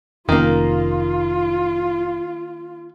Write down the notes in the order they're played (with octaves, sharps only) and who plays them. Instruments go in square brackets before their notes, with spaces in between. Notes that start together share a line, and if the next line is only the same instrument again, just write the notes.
[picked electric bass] F1 C#4 [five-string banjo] D#3 A#3 [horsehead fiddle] F4